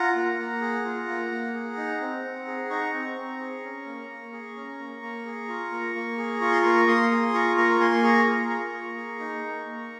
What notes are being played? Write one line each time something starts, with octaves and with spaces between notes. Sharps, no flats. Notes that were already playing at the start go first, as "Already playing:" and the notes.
Already playing: F4 F#5 A#5
A#3
A#3
G#4
F4
A#3
A#3
G#4
D#4
C4
C4
G#4
D#4 A#5 C#6
C4
C4
G#4
C#4
A#3
A#3
G#4
C#4
A#3
A#3
G#4
F4
A#3
A#3
G#4
F4 C#6
C6
A#3 A#5 C#6
A#3 C6 D#6
G#4
F4 A#5 C#6
A#3 A#5 C#6
A#3 G#5 C6
G#4 A#5 C#6
F4
A#3
A#3
G#4
D#4
A#3
A#3